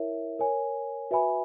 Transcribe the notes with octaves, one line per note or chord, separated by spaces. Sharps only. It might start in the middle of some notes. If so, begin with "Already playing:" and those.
Already playing: E4 A#4 C#5 E5
A#4 C#5 G#5
F#4 B4 E5 G#5 B5